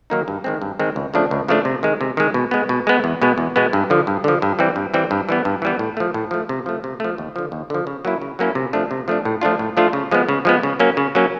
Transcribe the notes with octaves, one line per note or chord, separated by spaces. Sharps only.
D#3 F#3 A#3 D#4
G2
D#3 G#3 C4
G2
D#3 G#3 C4
C#2
C#3 F3 A3 D4
C#2
C#3 F3 A3 D4
C3
D#3 G#3
C3
D#3 G#3
B2
G#3 B3
B2
G#3 B3
E2
B2 G#3 B3
E2
B2 G#3 B3
G2
D3 F3
G2
D3 F3
G2
E3 G3 C4
G2
E3 G3 C4
G2
E3 G3 B3
G2
E3 G3 B3
A2
F3 A3
A2
F3 A3
C3
F3 A3
C3
F3 A3
D#2
D3 F3
D#2
D3 F3
C#3
F#3 A#3 C#4 E4
C#3
F#3 A#3 C#4 E4
C3
F3 A3 D4
C3
F3 A3 D4
A2
F3 A3 D4 F4
A2
F3 A3 D4 F4
C#3
F3 G#3 B3
C#3
F3 G#3 B3
C#3
F#3 A#3 C#4
C#3
F#3 A#3 C#4